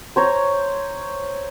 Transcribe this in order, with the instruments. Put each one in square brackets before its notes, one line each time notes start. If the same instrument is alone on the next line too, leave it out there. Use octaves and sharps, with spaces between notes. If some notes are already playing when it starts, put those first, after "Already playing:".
[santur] C5 C#5 A#5